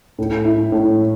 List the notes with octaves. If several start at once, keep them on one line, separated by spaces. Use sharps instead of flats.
A2
E4
A2